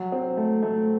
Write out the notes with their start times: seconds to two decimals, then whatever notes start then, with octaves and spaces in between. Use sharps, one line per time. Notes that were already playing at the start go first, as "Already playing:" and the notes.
Already playing: F#3
0.12 C4
0.37 A3
0.63 A3